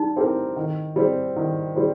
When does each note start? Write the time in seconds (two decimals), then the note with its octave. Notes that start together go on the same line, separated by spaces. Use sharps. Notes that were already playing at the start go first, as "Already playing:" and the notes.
Already playing: G3 D#4
0.17 C4 G4 A#4
0.56 D#3
0.96 G3 C4
1.36 D#3
1.76 G3 C4